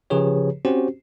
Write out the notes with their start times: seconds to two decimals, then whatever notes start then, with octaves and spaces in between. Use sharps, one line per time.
0.10 C#3 F3 G4 G#4 B4 C#5
0.65 C4 C#4 F#4 G4 C5